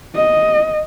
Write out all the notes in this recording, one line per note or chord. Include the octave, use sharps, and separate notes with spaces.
D#5